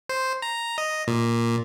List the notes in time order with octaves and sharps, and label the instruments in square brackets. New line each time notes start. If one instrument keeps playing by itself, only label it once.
[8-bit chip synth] C5
A#5
D#5
A#2